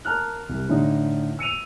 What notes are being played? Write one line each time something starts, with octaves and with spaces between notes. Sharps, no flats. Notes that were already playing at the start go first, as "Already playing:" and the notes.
A#4 A5 A#5 F6 F#6
C2
A2 D3 D#4
E6 C#7 D#7 F7